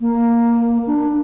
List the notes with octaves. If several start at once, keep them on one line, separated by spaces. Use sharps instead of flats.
A#3
D4